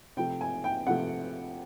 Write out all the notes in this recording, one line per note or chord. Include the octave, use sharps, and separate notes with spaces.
C3 F3 A3 G5
G#5
G5
C3 F3 A3 F#5